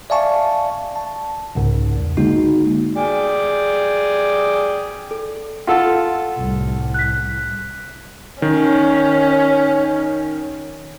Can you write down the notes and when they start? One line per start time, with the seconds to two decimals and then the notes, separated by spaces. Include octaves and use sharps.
0.10 D5 E5 F5 G#5 A5 C#6
0.96 A5
1.55 C2 G#2 C#3
1.96 E2
2.17 D3 G#3 A#3 D#4 F#4
2.95 G#4 D5 G5
5.11 A4
5.67 F4 A4 F#5
6.36 C2 A2
6.94 F#6 B6
8.42 D#3 C#4